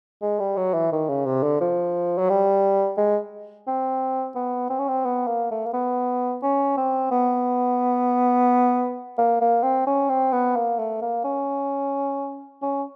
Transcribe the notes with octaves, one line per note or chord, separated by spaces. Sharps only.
G#3
G3
F#3
E3
D#3
C#3
C3
D3
F3
F#3
G3
G#3
C4
B3
C4
C#4
C4
B3
A#3
A3
A#3
B3
C#4
C4
B3
A#3
A#3
C4
C#4
C4
B3
A#3
A3
A#3
C#4
C#4